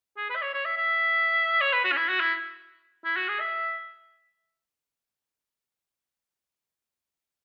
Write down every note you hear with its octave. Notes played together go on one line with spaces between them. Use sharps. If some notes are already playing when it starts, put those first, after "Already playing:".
G#4
B4
E5
C#5
C#5
E5
E5
C#5
B4
F#4
C#4
E4
F#4
E4
E4
F#4
G#4
E5